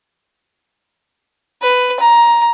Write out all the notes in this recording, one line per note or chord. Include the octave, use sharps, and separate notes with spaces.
B4
A#5